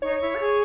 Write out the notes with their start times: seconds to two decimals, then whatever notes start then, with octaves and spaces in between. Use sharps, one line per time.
0.02 D#4 C#5
0.21 E4
0.35 A4
0.40 G#4